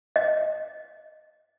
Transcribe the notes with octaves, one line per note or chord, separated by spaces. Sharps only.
D#5